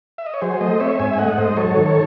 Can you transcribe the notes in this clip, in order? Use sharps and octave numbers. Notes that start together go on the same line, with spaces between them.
E5
D#5
C#5
F#3 G#4 C5
A3 C5 D#5
C4 C#5 E5
G#2 E5 G#5
G#5
A3 D#5 F#5
G#2 C5 D#5
F#3 A4 C#5
D#3
A4 C#5